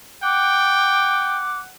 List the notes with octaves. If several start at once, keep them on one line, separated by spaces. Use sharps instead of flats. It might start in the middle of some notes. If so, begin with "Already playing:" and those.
F#5 G5 D6